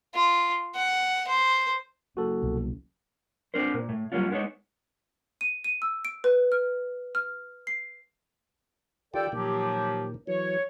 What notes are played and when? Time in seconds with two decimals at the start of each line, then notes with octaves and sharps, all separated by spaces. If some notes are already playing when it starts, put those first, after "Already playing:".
0.15 F4
0.75 F#5
1.28 C5
2.17 F#1 F#4 A4
2.42 C2 B2 F3
3.54 C4 D4 A#4 C5
3.74 A#2
3.89 A2
4.12 F#3 G3 A#3 C#4 F4
4.30 G#3 B3 C#4 D#4 C#5
5.41 D#7
5.64 D#7
5.82 E6
6.05 D7
6.24 B4
6.52 F6
7.15 F6
7.67 C7
9.14 D#3 F4 G4 A4 D5 G5
9.32 A#2 D#3 F3 F#3 G4
10.27 E3 F#3 C#5